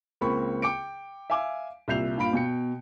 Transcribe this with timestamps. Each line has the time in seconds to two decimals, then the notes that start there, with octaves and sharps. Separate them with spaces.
0.21 C#2 A#3 C4 B5 C#6
0.62 G5 D6 C#7 D7
1.30 E5 F5 G#5 D6
1.88 C2 A#2 E5 G6 C7 F7
2.18 G2 A#2 F5 B5 D7
2.33 B2 G5 C#7